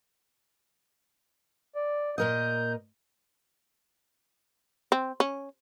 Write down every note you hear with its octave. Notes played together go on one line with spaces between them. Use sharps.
D5
A#2 A#4 D#5 G6
C4
C#4